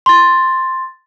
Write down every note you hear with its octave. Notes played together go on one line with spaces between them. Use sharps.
C6 A6